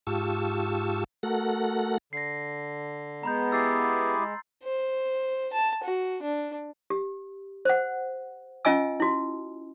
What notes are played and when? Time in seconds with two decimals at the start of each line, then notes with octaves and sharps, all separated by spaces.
0.07 G#2 F4 G4 A5 C#6 E6
1.23 A3 F#4 A4 A#4 F#5 A#6
2.13 D3 A#6 C7
3.23 G#3 B3 A#5 B5 G6
3.52 E4 G4 G#4 E6 A6 C7
4.16 G#3 C6
4.63 C5
5.53 A5
5.83 F#4
6.23 D4
6.90 G4
7.65 C5 F#5
8.65 C#4 F4 D#5 G#5 E6
9.00 E4 F#4